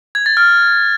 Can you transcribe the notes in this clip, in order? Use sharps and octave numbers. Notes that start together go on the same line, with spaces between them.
G#6
A6
F6